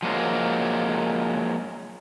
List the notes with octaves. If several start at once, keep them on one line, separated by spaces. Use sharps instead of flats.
F3 F#3 G#3 A#3